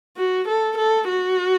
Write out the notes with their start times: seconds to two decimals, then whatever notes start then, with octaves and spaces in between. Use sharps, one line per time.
0.17 F#4
0.48 A4
0.77 A4
1.08 F#4